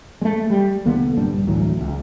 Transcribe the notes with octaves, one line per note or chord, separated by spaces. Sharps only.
G#3 A3
G3
C2 D3 A#3 B3
A#1 G2 G3 D4
D2 A2 E3 F#3
D#1 C#2